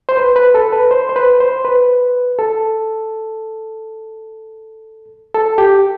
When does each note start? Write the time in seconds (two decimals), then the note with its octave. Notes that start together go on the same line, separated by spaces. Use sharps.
0.09 C5
0.17 B4
0.36 B4
0.54 A4
0.73 B4
0.91 C5
1.09 C5
1.16 B4
1.40 C5
1.65 B4
2.39 A4
5.34 A4
5.58 G4